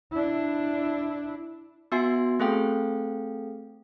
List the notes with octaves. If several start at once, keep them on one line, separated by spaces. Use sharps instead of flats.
D4 E4
B3 F#4 E5 G#5 C6 C7
A3 C4 G#4 A4 F5 G5